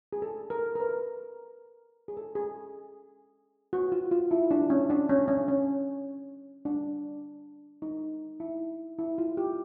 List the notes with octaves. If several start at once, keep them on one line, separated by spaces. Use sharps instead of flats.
G#4
A4
A#4
A#4
B4
G#4
A4
G#4
F#4
F4
F4
E4
D4
C#4
D4
C#4
C#4
C#4
D4
D#4
E4
E4
F4
G4